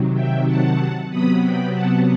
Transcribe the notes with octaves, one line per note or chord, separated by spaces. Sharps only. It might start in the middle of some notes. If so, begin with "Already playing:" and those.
Already playing: C3 D#3 F#3
E5 G5
F#5 A5
C3 F#3 B3 B5 D#6
G5 B5
F#5 A5